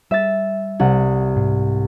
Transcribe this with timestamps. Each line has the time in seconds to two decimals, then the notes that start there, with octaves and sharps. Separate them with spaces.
0.11 G3 E5 A6
0.80 C2 F#5
1.36 G#2